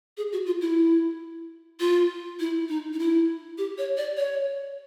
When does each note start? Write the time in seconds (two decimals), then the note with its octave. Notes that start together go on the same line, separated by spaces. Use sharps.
0.17 G#4
0.32 F#4
0.46 F4
0.61 E4
1.80 F4
2.40 E4
2.69 D#4
2.93 D#4
2.99 E4
3.58 G4
3.78 C#5
3.97 D5
4.17 C#5